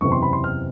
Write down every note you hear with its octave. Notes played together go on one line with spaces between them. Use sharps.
F#1 E2 C3 C#6
C6
B5
C6
F6